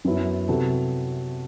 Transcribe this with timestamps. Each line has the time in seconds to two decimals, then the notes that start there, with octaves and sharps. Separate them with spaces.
0.05 F#2 F#3 B3 E4
0.48 C3 F#3 B3 F#4 A4